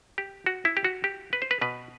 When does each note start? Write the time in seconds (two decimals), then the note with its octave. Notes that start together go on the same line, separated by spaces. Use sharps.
0.18 G4
0.46 F#4
0.65 E4
0.77 G4
0.84 F#4
1.04 G4
1.33 B4
1.42 C5
1.51 B4
1.61 B2 B4